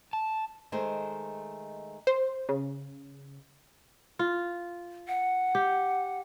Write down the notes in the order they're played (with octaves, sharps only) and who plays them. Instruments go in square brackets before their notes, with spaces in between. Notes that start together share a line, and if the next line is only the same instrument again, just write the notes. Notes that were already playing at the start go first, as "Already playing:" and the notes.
[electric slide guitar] A5
[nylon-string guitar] D#3 G#3 A3 C5
[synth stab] C5
C#3
[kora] F4
[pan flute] F#5
[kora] G4